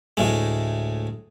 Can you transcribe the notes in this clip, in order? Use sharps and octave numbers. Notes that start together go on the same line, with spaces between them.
D2 A2 G#3